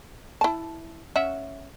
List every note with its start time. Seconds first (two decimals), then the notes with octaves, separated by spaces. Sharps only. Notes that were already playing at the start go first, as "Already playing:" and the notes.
0.41 E4 A5
1.16 C#4 E5 F#5